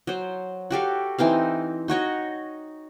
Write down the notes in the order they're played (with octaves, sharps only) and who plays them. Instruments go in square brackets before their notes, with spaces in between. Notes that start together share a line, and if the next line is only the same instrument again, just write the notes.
[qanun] F#3 C5
F#4 G4 A4 F5
E3 C4 D#4 F5
D#4 F#4 C#5 D#5